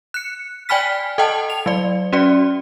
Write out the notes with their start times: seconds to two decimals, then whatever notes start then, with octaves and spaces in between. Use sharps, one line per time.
0.14 F#6 C#7
0.69 D5 G5 G#5 B5 F6 B6
1.18 A4 D#5 F#5 G5 A5
1.50 F7
1.66 F#3 D5
2.13 C#4 F#4 D5